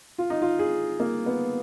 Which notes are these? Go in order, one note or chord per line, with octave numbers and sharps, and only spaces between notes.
F4
D#4
F4
G#4
A#3
B3